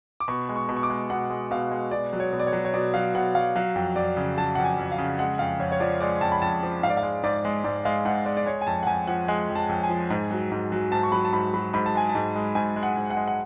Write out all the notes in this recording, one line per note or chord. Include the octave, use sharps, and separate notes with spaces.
D6
B2 C#6
G#3
C#6
B2
C#6
D6
G#3
B2 F#5
G#3
B2 F5
G#3
B2 D5
F#3
C#5
B2
D5
C#5
F#3
C#5
B2 D5
F#3 F5
B2 F#5
F#3 F5
F#3 F5
F2
F2 D5
C#3
F#3 A5
F2 F#5
G#5
F2
F5
C#3
G#3 F#5
F2 F5
F2 C#5
C#5
F3 D5
G#3 D5
F2 A5
B5
F2 A5
F3
G#2 F5
D5
F5
G#3
G#2 D5
G#3
G#2 D5
G#3 F5
G#2 F#5
G#3 D5
D5
G#3 C#5
G#5
F2 A5
F#5
F2 G#5
F3 F#5
G#3 G#5
F2
A5
F2
G#5
F3
G#2
F#3
G#2
F#3
G#2 A5
C#6
F#3 B5
A5
G#2 B5
F#3 B5
G#2 B5
A5
G#3 G#5
A5
G#2
G#3
G#2 G#5
G#3
F#5
G#2
F#5
G#3
F#5